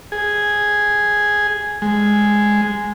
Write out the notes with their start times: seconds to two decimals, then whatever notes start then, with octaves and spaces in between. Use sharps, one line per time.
0.12 G#4
1.82 G#3